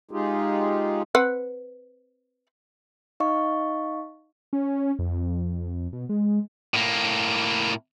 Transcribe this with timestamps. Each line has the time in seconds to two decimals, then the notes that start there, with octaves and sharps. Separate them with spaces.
0.11 G#3 D#4 F4 G4 G#4
1.15 C4 B4 F#5
3.20 D#4 D#5 F5 C#6
4.53 C#4
4.99 F2
5.93 B2
6.09 G#3
6.74 A2 A#3